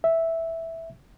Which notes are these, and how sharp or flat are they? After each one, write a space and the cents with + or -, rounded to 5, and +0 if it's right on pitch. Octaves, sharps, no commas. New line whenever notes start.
E5 -5